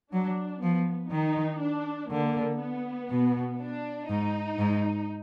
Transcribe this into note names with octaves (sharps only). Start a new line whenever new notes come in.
F#3 D4
F3 B3
D#3 D#4
D4
D3 A#3
B3
B2
D4
G#2 D#4
G#2